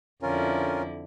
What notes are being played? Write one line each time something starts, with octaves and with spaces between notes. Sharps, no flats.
F2 D3 C#4 E4 F4 A#4